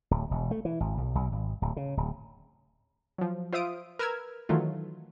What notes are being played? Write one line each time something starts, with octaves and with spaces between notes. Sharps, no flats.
D1
E1
A3
E3
G#1
B1
B1
G#1
D1
C#3
D1
F3 F#3
F4 C5 E5 F5 D#6 D7
A#4 B4 E6 F6 G#6
D#3 E3 F#3 A3 F4